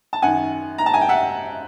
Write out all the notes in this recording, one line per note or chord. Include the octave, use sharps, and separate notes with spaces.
A5
F#2 D#3 F#5 G#5
A#5
A5
G#5
G5
E5 F#5